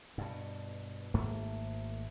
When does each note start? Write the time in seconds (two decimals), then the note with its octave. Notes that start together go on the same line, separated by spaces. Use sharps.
0.18 G2 B2
1.14 G#1 G#2 A3 A#3